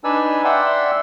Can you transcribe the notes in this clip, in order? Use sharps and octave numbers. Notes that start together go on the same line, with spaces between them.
D4 D#4 B4 D5 G#5 E6
D5 E5 F#5 G5 C6 E6